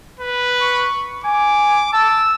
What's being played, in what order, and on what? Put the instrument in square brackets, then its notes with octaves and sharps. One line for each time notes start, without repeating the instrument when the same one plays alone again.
[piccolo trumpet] B4
[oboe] C#6
[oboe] G#5 [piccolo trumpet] D6
[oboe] A5 [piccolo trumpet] E6